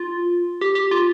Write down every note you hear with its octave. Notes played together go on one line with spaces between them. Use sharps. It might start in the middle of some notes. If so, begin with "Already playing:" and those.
Already playing: F4
G4
G4
F4